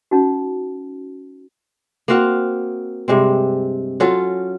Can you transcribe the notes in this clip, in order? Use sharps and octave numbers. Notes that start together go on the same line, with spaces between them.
C#4 D#4 F#4
A#3 C4 F#4 F5
G2 C3 G#3 C4
F#3 C#4 F4 A4